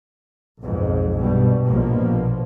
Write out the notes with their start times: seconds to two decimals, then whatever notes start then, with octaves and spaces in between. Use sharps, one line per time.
0.61 B1 F2 G#2
1.17 G2 B2 G3
1.67 A#1 B2 F3 A#3